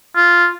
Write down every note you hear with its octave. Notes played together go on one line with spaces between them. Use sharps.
F4